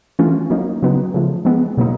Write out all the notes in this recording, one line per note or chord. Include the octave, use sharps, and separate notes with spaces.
E3 A3 C#4 F4
F#3 A#3 D#4
C#3 F#3 B3 D#4
C#3 F3 A3
F3 G#3 B3
B2 F#3 A#3 D#4